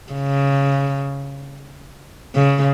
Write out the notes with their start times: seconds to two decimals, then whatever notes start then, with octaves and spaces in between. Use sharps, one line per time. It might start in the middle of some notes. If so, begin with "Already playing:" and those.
0.13 C#3
2.35 C#3